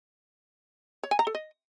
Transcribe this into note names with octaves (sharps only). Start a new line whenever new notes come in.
C#5
G#5
A#5
A4
D#5